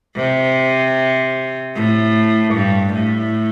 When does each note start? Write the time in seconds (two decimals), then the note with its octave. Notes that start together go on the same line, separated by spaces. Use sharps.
0.16 C3
1.75 A2
2.55 G2
2.94 A2